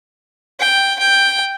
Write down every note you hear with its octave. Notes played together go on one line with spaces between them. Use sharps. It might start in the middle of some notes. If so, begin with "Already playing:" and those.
G5
G5